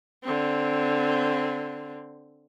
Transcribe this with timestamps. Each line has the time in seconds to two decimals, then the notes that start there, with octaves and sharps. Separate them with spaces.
0.24 D3 C4